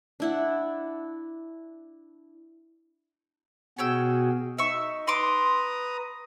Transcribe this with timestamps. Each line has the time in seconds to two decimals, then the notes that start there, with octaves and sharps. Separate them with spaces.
0.20 D4 E4 F#5
3.78 B2 C#4 F#4 G#4 G5 E6
4.58 D#4 E5 C#6
5.08 B4 A#5 C6 D6 D#6